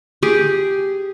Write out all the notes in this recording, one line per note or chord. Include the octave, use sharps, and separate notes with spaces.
G4 G#4